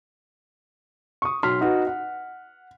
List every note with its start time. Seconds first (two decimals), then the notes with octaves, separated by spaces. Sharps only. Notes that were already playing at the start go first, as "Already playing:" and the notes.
1.22 C#6 D#6
1.43 B1 C6 F6 B6
1.61 D#4 F#4 B4
1.87 F#5